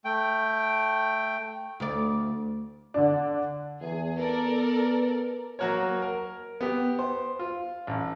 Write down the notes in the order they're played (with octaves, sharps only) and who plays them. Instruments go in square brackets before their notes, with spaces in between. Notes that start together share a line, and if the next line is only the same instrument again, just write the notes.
[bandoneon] A3 G5
[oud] D2 D5
[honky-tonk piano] D3 D4
[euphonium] E2 [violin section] G#4
[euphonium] B3 [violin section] A4 A#4 D5
[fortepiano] F#3 A#3 F#4 A#4 C#5
A#4
B3 G4
C5
F4
A1